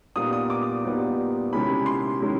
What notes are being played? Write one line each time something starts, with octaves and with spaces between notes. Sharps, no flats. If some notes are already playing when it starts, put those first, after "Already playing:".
A#2 G3 B3 D#4 D#6
D#6
D6
A#2 G3 B3 D#4
C3 D#3 G#3 C#4 E4 B5
C6
D#3 G#3 C#4 E4